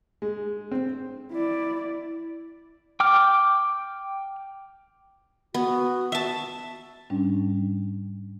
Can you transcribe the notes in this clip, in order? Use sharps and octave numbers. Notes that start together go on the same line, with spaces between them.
G#3
C4
E4 D5
G5 D6 F6
B3 F#4
E5 A5
G#2 G3 C#4 D4